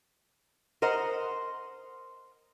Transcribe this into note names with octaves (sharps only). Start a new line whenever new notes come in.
A#4 C5 D#5 F#5